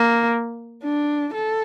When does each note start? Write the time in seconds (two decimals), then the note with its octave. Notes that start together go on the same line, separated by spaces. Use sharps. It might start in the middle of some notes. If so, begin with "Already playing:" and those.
Already playing: A#3
0.83 D4
1.34 A4